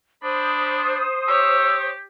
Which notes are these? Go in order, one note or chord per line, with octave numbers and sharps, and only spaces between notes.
D4 C5 B5 D#6
G4 C#5 E6